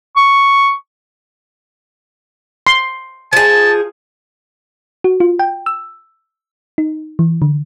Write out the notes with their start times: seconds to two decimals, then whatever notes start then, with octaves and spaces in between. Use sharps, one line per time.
0.16 C#6
2.67 C6
3.33 F3 G#4 A5
5.04 F#4
5.20 F4
5.39 G5
5.66 E6
6.78 D#4
7.19 E3
7.42 D3